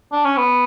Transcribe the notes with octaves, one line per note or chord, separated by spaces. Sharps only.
D4
C#4
B3